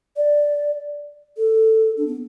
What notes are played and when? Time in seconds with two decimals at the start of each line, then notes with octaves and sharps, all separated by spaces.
0.17 D5
1.37 A4
1.97 D4
2.07 B3